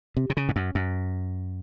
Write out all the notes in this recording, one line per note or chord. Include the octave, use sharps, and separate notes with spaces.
C3
C3
C#3
G#2
F#2
F#2